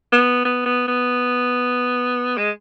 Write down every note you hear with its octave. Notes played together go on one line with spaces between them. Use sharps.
B3
B3
B3
B3
G#3